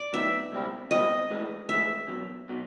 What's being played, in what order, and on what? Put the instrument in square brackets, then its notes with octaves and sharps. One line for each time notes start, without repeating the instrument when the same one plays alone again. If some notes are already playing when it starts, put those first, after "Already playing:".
Already playing: [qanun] D5
[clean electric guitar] A2 F#3 B3 D#4 [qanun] E5
[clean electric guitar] C#2 B2 G3 C4 E4
[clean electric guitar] C#2 B2 G3 C4 E4 [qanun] D#5
[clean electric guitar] A2 E3 G#3
[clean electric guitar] A2 E3 G#3 [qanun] E5
[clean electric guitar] E2 B2 F#3
B2 F#3